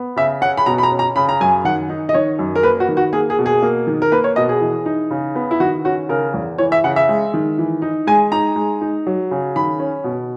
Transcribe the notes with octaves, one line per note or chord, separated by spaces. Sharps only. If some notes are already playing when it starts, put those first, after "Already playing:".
Already playing: B3
C#3 E5
C#4 F#5
B5
B2 A#5
B5
A#5
C#4
A#5
C#3 B5
A#5
F#2 G#5
D#3 F#5
D#4
D#5
D#3 C#5
F#2
A#4
A#3 B4
F#4
D#3
F#4
A#3 G#4
G#4
B2
G#4
A#3
D#3
A#4
A#3 B4
C#5
B2 D#5
G#4
E3
D#4
C#3
B3
E4
D#3 F#4
C#4 F#4
C#3 A#4
E2
E3 C#5
E5
C#3 F#5
E5
G#3
D#3
E3
D#4
G#3 G#5
D#4 A#5
G#3
D#4
F#3
C#3
D#3 B5
C#4
B2